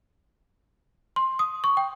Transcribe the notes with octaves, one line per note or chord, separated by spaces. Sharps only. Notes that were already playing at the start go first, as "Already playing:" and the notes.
C6
D#6
C#6
G5